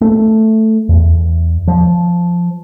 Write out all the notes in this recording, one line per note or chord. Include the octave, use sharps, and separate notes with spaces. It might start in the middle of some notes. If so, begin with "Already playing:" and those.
A3
E2
F3